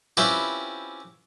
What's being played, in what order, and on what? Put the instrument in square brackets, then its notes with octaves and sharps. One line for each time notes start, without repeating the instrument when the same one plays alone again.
[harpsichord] C4 C#4 E4 F4 G4 B4